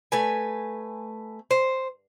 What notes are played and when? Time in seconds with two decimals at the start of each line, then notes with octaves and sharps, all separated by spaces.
0.12 A3 B4 G#5
1.51 C5